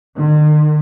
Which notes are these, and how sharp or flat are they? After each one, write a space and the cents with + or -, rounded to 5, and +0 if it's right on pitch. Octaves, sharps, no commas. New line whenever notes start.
D#3 -45